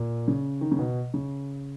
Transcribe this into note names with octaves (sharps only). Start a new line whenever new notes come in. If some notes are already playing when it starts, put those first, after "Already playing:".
Already playing: A#2
C#3
D#3
C#3
B2
C#3